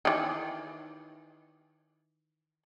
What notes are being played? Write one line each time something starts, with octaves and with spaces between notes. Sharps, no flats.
D#3 E3